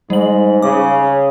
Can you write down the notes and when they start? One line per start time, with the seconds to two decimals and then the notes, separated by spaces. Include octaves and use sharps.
0.10 G#2 G3 F#7
0.62 C#3 D6